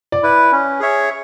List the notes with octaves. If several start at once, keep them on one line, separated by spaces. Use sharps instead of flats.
D5
E4 B4
C#4
G#4 C#5 E5